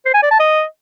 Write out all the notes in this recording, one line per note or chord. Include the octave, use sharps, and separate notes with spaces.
C5
G#5
D5
A5
D#5